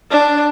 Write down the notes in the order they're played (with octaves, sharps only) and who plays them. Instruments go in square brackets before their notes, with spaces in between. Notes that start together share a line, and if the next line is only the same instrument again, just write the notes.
[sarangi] D4